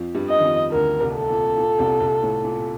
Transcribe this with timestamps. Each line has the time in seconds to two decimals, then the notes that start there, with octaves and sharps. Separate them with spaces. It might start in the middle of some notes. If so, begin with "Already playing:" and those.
Already playing: F2 F3
0.15 G2 G3
0.29 D#5
0.39 D#3
0.44 F2 F3
0.72 D2 D3 A#4
1.01 C2 C3
1.15 A4
1.29 A#2
1.58 A#2
1.79 C2 C3
2.00 C2 C3
2.23 A2
2.44 A#2